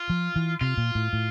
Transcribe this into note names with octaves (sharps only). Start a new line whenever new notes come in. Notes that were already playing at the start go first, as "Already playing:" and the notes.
Already playing: F4
F3
E3
C3 F4
A#2
A2
A2